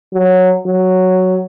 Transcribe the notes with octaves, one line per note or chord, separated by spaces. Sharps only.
F#3
F#3